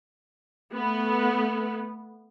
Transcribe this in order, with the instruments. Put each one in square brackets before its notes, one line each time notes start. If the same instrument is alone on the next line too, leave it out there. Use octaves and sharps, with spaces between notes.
[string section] A3 B3